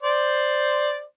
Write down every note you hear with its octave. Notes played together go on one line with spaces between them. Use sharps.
C5 D5